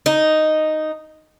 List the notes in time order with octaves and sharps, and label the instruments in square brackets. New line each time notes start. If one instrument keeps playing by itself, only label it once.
[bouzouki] D#4